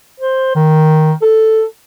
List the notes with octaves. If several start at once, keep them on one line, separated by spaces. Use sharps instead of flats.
C5
D#3
A4